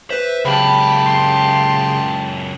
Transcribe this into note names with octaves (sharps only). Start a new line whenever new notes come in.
B4 C5 E5
C#2 F#2 C#3 G4 A5 B5
C6